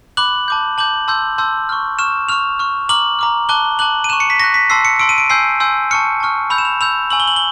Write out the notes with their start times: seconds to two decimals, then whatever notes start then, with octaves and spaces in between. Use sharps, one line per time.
0.17 B5 D6 F#6 F#7
0.48 A5 D6 G6
0.78 A5 D6 G6 F#7
1.08 A5 C6 E6 G6
1.38 A5 C6 E6 G6
1.69 C#6 F6
1.99 C#6 F6 E7
2.29 C#6 F6 F7
2.59 C#6 F6
2.89 A#5 D6 F6 F#7
3.19 A#5 D6 F6
3.49 A5 D6 F#6 G7
3.79 A5 D6 F#6 F#7
4.04 D#7
4.09 C#6 F#6 E7
4.20 C#7
4.30 B6
4.40 C#6 F#6 A#6
4.54 B6
4.70 A5 C6 E6 C7
4.85 C#7
4.99 A5 C6 E6 D7
5.09 D#7
5.18 D7
5.30 G#5 C6 E6 G6 C7
5.60 G#5 C6 E6 G6
5.91 A5 C#6 F6 C#7
6.20 A5 C#6 F6
6.50 B5 E6 G6 F7
6.58 E7
6.65 F7
6.81 B5 E6 G6 F7
7.10 G#5 C#6 E6 F#7
7.20 G7
7.28 F#7
7.36 G7